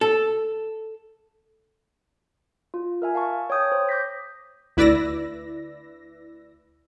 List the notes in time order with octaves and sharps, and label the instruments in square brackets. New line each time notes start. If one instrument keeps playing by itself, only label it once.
[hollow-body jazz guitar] A4
[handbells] F4
A#4 E5 G#5
F5 A5 C#6
C#5 G5 D#6 G6
C5
D6 G6 A#6 B6
[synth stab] D2 E4 B4 D5 E6 A#6